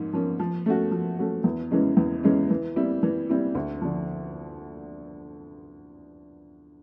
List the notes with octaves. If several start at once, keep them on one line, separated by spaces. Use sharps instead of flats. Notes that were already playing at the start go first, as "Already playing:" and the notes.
Already playing: G#2 F3 A#3 C#4
F3 A#3 C#4
F3
A3 C#4 F#4
F3
A3 C#4 F#4
E2
C#3 E3 G#3 C#4
E2
C#3 E3 G#3 C#4
E3
G3 C4 E4
E3
G3 C4 E4
D2
D3 F3